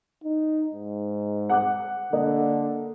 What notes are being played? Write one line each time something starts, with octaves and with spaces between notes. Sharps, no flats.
D#4
G#2
F#5 D6 F#6
D3 A#3 D#5